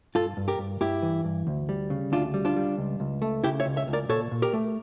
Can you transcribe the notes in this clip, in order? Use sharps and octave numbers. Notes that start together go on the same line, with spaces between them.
G2 F4 A4
G2
G4 A#4
G2
G2 E4 G4
E3
G2
D2
G3
C#3
D2 D4 F4
G3
D4 F4
G3
C#2
C#2
A3
C#3 E4 G4
C#5 E5
C#2
C#5 E5
C#2
A#4 D5
A#2 A4 C#5
A#2
G4 A#4
A3